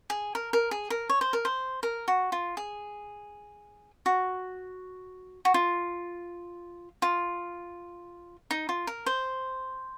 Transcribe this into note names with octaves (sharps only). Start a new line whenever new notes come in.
G#4
A#4
A#4
G#4
A#4
C#5
C5
A#4
C5
A#4
F#4
F4
G#4
F#4
F#4
F4
F4
D#4
F4
A#4
C5